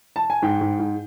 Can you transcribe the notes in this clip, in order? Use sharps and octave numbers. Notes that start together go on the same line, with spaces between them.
A5
G#5
G#2 G5
G#2
G#2